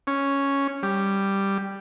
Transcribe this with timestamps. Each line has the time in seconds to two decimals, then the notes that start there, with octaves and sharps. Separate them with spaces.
0.07 C#4
0.83 G3